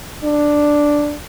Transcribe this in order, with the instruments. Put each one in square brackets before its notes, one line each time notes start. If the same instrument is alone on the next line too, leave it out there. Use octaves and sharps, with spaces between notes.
[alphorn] D4